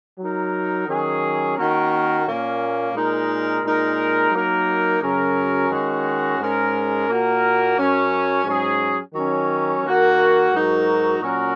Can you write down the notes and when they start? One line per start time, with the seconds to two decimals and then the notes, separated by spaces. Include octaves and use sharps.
0.19 F#3 D#4 A#4
0.88 D#3 F#3 C#4 G#4
1.56 D#3 A#3 C#4 F#4 A#4
2.26 A#2 A#3 C#4
2.94 A#2 G#3 D#4 A#4
3.63 A#2 G#3 D#4 A#4
4.31 F#3 A#3 D#4 A#4
5.01 F#2 C#3 F#3 C#4 A#4
5.70 D#3 G#3 C#4 F#4
6.39 G#2 G#3 C#4 A#4
7.08 A#2 A#3 F#4 A#4
7.77 F#2 F#3 C#4
8.45 G#2 F#3 C#4 G#4
9.14 D#3 F#3 C#4
9.83 D#3 A#3 F#4 A#4
10.52 G#2 F#3 D#4 F#4 A#4
11.21 A#2 F#3 C#4 F#4 A#4